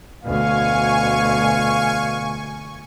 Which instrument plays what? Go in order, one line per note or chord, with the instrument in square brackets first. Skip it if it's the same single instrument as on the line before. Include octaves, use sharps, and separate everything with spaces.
[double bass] D2 B2 [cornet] F5 [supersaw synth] G#5 C#6